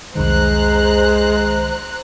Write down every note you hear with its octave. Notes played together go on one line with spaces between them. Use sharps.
C2 F2 D#3 G#3 C5 A#5 F#6